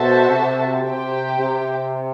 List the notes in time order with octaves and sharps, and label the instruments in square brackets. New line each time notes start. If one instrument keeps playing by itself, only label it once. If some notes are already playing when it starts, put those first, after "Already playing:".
Already playing: [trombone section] B2 [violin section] F#4 A4 C5 E5 A5
[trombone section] C3
[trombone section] C3 [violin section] G4 C5 G5
[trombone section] C3